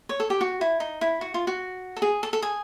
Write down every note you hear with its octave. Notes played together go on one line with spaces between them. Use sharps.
C#5
A4
G4
F#4
E4
D#4
E4
F#4
F4
F#4
A4
G#4
A4
A4
G#4